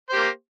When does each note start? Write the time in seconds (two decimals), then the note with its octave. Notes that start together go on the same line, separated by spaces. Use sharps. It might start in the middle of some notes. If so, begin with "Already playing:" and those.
0.10 C5
0.13 G4
0.16 A#3